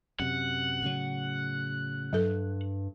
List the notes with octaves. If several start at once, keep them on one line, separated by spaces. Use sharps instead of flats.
F#2 C3 F#5
A2 C#3 F#3
G2 F#3 A4